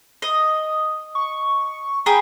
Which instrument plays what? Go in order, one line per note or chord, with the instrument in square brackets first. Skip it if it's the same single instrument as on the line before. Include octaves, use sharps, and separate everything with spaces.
[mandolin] D#5
[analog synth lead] C#6
[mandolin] G#4 G5 B5 [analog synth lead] A#5